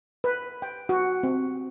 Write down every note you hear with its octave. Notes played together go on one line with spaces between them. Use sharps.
B4
G5
F#4
C4